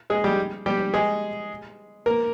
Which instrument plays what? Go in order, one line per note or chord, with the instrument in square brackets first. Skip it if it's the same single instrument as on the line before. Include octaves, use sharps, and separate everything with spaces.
[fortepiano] G#3 G#4
G3 G4
G3 G4
G#3 G#4
A#3 A#4